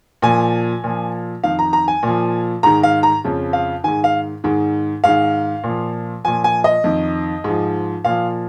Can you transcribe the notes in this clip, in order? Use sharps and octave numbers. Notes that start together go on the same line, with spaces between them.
A#2 F3 G#5
A#2 F3
F2 D#3 F5
A#5
A#5
G#5
A#2 F3
G#2 D#3 A#5
F5
A#5
F2 C#3 F3
F5
G#2 D#3 G#5
F5
G#2 D#3
G#2 D#3 F5
A#2 F3
A#2 F3 G#5
G#5
D#5
F2 D#3
G#2 F3
A#2 F3 F5